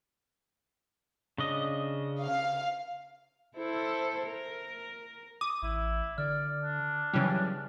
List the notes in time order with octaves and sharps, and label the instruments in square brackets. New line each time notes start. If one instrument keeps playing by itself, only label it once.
[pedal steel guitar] C#3 D4 D#5
[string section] F5
[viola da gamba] E4 A4 C5
A#4
[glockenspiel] D6 [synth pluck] D#6
[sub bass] A1 [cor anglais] E4
[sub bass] D3 [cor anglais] D5 [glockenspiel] F6
[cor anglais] D4
[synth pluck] C#3 E3 G3 [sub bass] F#3